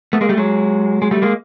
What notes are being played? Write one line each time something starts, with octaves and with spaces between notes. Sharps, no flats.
A3 B3
G#3 A#3
G3 A3
F#3 G#3
G#3
G3 A3
G#3 A#3